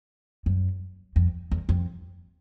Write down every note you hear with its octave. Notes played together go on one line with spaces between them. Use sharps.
F#2
F2
E2
F2